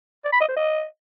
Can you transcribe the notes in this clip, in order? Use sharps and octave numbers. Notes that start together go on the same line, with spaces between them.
D5
B5
D#5
C5
D#5